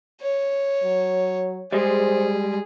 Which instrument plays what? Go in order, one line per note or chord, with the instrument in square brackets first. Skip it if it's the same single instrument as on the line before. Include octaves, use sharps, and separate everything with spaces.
[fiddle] C#5
[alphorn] F#3
[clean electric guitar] G3 G#3 [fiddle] G#4 [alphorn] C5